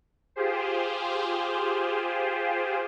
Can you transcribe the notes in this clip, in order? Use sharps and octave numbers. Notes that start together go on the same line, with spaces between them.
F4 G4 G#4 C5